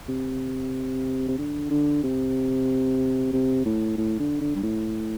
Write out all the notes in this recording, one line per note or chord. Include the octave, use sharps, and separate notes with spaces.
C3
C3
D3
D3
C3
C3
A2
A2
D3
D3
G2
A2